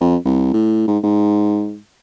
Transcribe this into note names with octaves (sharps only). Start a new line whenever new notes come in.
F2
C2
A2
G#2
G#2